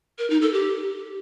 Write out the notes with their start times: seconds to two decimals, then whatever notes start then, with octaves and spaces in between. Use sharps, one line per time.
0.18 A#4
0.30 D#4
0.42 A4
0.53 G4